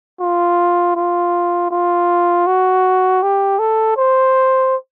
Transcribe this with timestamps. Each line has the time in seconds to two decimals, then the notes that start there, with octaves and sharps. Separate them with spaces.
0.20 F4
0.96 F4
1.70 F4
2.46 F#4
3.22 G4
3.59 A4
3.97 C5